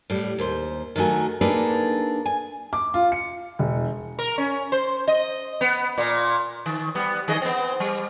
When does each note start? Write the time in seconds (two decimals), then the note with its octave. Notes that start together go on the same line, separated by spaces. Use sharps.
0.10 A2 G3
0.38 D#2 C5
0.96 D#3 F#3 A3 F#4 G#5
1.41 A#3 D4 D#4 G#4 A4 B4
2.26 G#5
2.73 D6
2.94 F4
3.12 C#7
3.59 E1
4.19 A#4
4.38 C#4
4.72 C5
5.08 D#5
5.61 B3
5.98 A#2
6.66 D#3
6.95 G3 B3
7.28 D#3 G#4 D#5
7.41 B3 C4
7.80 G3